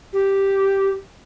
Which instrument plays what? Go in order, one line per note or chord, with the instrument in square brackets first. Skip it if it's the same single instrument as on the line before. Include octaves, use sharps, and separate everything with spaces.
[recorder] G4